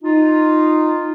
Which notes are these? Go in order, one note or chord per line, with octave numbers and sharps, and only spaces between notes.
D#4 F4